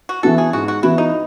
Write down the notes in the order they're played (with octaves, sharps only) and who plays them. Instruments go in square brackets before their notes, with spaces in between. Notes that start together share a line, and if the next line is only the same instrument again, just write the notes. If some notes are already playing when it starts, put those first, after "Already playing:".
[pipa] F#4
[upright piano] E3 B3 F#4 [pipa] A4
[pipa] G#4
[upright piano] G#2 [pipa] F#4
[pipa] F#4
[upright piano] E3 B3 F#4 [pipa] E4
[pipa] D#4